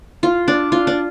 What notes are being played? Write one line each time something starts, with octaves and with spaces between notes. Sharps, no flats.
F4
D4
F4
D4